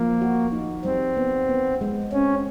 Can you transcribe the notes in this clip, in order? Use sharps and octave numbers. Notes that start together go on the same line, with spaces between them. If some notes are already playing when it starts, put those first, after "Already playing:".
Already playing: F3 A#3
F#4
D#4
G3 C4
B3
B3
G#3
C4 C#4